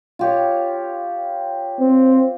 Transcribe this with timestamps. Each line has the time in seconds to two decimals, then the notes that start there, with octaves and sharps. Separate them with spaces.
0.19 F4 G4 C#5
1.80 C4